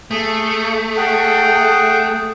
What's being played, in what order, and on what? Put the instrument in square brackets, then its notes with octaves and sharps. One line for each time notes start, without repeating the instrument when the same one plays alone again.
[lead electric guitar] A3 [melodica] G#4
[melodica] G#4 F#5 G5